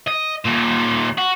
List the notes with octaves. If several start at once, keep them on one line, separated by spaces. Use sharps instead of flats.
D#5
D#2 A#2
F#4